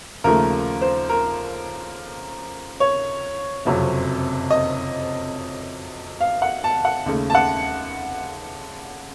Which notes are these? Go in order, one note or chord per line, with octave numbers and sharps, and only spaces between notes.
D#2 C#3 F3 A3 A#4
C5
A#4
C#5
F#1 F2 C3 F#3
D#5
F5
F#5
A5
F#5
D#2 C#3 A3
A5
F#5